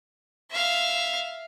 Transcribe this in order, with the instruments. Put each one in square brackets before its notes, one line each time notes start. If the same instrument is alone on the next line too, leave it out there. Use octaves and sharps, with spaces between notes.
[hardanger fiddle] E5 F5